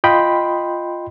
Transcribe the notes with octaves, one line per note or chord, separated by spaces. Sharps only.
F4 D#5 G5 B5 C6